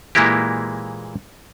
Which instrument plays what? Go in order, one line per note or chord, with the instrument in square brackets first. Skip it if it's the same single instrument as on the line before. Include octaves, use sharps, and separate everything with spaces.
[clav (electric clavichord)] A#2 E3 G#3 A#3 E4 G4